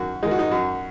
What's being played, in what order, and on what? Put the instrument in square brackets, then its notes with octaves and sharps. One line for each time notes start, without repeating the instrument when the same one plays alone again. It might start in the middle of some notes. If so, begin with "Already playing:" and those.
Already playing: [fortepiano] F#2 D#3 F#4
D#3 G#3 D#4
F#4
D#4
F#2 F#4